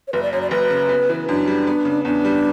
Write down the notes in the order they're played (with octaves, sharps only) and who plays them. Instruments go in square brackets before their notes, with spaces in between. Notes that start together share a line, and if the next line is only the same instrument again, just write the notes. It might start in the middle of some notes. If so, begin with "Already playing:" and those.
[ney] C#5
[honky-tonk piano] F#1 [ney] B4
[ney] D5
[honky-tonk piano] F#2 [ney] C#5
[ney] D5
[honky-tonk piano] F#1 [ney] B4
[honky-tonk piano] C#3
B3
E3
[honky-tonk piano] F#2 [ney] D4
[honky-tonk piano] G3
B3
C#3
[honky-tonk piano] E2 [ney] D4
[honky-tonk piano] G3